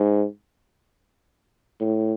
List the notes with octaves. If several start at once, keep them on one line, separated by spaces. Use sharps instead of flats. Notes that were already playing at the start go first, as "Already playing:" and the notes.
Already playing: G#2
A2